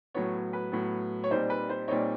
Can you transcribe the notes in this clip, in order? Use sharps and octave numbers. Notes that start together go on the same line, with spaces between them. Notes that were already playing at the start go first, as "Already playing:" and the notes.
A2 F#3 B3 C#5
B4
A2 F#3 B3
C#5
A#2 G3 C4 D#4 C5
B4
C5
A#2 G3 C4 D#4 C#5